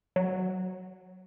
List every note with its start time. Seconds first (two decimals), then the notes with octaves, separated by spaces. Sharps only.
0.16 F#3